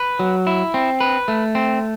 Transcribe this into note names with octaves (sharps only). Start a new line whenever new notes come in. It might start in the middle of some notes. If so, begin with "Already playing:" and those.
Already playing: B4
F#3
E4
C4
B4
A3
C4